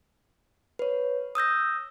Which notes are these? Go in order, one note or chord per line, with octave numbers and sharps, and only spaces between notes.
B4 C#5
D#6 E6 G6 A#6